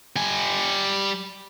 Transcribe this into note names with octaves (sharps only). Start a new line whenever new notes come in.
G3 G#5